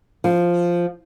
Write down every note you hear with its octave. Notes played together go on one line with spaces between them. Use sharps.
F3